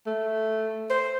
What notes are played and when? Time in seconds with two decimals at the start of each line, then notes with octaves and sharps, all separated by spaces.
0.06 A3
0.90 C5